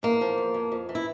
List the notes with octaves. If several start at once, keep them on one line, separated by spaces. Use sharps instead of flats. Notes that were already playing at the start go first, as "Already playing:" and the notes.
E2 A#3
F3
E2
F2
F2
E3
E4